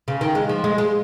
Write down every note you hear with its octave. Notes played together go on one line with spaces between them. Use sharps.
C#3
D#3
G#3
F3
G#3
G#3